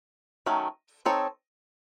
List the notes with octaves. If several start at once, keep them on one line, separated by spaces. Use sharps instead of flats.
D#3 F#3 A3 C#4
C4 D#4 A4 C#5